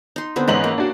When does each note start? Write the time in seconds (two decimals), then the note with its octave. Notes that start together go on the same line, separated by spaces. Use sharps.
0.16 D#4 C6
0.36 D3 B3 C4
0.48 G#2 E3 C#4 E4 D#5 F#7
0.64 A#3
0.78 D4 F#4